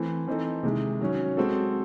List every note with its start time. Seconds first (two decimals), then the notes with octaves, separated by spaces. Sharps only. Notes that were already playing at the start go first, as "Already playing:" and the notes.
Already playing: E3 A3 C4
0.27 E3 C4 D#4 A4
0.63 C3 D#3 G#3
1.00 D#3 F#3 C#4
1.37 G#3 C4 F#4 A4